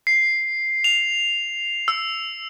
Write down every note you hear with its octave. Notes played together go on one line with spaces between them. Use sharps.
C7
F7
E6